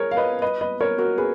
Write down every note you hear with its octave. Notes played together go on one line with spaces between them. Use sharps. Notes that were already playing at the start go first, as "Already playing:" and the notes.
Already playing: G#4 A#4 C#5
F5
B4 D#5
B4 D#5
B4 D#5
A#4 C#5
F#4 A#4
G#4 B4